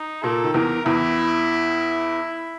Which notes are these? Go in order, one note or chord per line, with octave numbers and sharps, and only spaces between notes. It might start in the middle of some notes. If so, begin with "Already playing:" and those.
Already playing: D#4
A#2 A#3 A4
D#3
E2 E3 A#4
E2 E3 E4